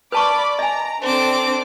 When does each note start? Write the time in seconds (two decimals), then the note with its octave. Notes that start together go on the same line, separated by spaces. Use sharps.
0.12 B4 D5 A5 B5 C#6 D6
0.59 D#5 G#5 A#5
1.01 C4 D4 A4 A5 D6